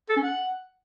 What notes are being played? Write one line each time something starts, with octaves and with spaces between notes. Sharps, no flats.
A4
C#4
F#5